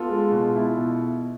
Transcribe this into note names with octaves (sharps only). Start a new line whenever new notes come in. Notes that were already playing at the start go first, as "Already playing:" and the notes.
Already playing: B3 F4 A4
G#3
B2
E4
B2